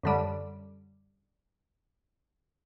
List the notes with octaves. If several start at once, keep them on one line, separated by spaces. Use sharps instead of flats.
F#2 D3 G3